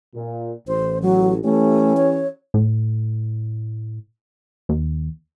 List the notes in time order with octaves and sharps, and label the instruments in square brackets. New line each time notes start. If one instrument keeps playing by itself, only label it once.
[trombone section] A#2
[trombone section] A1 [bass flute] C5
[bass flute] F#3
[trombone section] E3 C#4 G4 [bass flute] A3
[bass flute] C#5
[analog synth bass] A2
D#2